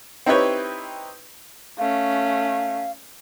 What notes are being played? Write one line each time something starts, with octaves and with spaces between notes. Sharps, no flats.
C4 D#4 E4 G4 B4 C#5
A3 C#4 F5